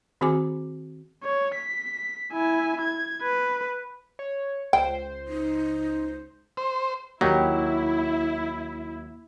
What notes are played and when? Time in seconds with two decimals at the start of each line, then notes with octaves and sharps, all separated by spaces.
0.21 D#3 C4 F#4 G#4 G#5 D6
1.24 C#5
1.55 B6
2.33 E4 G#5
2.82 G#6
3.23 B4
4.19 C#5
4.73 C#2 C5 G5
5.28 D#4
6.57 C5
7.21 D#2 F#3 A#3 D#4 E4 G4